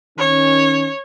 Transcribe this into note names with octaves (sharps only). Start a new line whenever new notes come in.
D#3 C#4 C#5